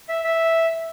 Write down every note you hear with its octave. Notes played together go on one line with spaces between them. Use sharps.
E5
E5